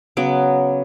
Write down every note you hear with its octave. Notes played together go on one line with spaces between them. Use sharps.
C#3 F#3 B3 D6